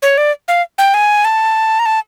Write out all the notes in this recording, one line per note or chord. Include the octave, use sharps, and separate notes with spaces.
C#5
D5
F5
G5
G#5
A5
A#5
A5